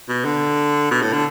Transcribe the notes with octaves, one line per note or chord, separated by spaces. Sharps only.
B2
D3
B2
A2
D3